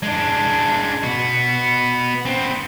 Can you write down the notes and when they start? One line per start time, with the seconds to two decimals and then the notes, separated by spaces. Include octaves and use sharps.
0.03 G#3 D4
1.03 B3 F#4
2.25 B3 C4